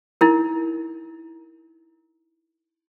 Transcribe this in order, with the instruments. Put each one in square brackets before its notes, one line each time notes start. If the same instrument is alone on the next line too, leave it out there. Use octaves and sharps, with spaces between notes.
[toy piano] D#4 E4 A#4